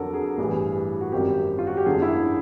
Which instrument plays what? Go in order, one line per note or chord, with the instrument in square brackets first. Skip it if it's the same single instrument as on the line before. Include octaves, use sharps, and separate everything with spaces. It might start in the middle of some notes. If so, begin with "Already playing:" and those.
Already playing: [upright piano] F2 D3 F#3 A4 A#4
G#4
A1 G2 E3
F#4
G#1 F#2 D#3 G3 C4 G4
F4
F#4
G4
G#1 F#2 D3 G#4
E4
F4